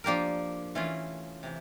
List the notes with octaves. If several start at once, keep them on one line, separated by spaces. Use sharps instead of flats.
F3 A#3 D4 G4 A#4
E3 A3 C#4 F4
C3 E3